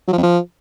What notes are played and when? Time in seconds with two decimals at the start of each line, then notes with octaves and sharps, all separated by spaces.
0.08 F#3
0.13 F3
0.18 F2
0.23 F3